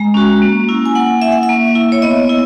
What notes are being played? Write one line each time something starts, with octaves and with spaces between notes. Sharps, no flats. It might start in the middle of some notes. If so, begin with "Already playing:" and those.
Already playing: G#3 A#5
C#4 F#4
A#3
C#4 E4
G#5
A#3 F#5
E4 E5
F#5
E5
A#3
E4
C#5
B3 D#5
E4